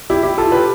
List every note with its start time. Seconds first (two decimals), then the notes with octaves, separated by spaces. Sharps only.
0.10 E4 G4
0.23 E4 G4
0.38 F4 A4
0.51 G4 B4